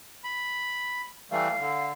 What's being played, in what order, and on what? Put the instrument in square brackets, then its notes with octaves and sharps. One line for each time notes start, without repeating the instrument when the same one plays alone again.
[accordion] B5
[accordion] E3 G3 A3 [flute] F5
[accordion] D3